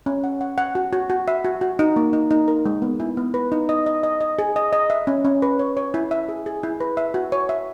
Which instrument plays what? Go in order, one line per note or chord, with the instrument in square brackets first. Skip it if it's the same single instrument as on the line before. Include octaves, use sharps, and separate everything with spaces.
[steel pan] C#4
F#5
F#5
F#5
F#4
F#4
F#4
E5
F#4
F#4
D#4
A#3
D#4
D#4
A#4
G#3
B3
E4
B3
B4
D#4
D#5
D#5
D#5
D#5
G#4
D#5
D#5
E5
C#4
C#4
B4
C#5
C#5
E4
E5
G#4
G#4
E4
B4
E5
F#4
C#5
E5